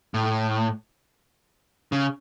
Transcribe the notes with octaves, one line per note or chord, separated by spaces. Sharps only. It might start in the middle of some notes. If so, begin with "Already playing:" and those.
A2
C#3